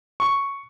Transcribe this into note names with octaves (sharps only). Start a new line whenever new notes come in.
C#6